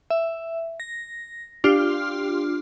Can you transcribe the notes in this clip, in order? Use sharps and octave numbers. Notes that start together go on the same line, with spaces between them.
E5
A#6
D4 F4 G4 F6